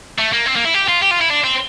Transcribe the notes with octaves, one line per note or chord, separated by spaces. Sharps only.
A3
A#3
C4
A#3
E4
G4
F4
G4
F4
E4
D4
C4